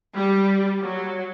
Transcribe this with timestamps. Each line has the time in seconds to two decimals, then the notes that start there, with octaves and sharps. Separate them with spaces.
0.16 G3
0.82 F#3